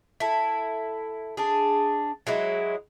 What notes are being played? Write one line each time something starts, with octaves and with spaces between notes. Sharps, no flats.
E4 A4
D4 G#4
F#3 G#3 E4